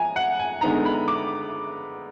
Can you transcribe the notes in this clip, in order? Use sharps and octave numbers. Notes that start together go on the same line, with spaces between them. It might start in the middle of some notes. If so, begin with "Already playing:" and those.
Already playing: F3 G#5 A#5
F#5
G#5
D3 G#3 B3 D#4 A#5
B5
D6